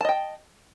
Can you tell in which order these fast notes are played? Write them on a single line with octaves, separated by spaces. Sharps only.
A5 D#5 G5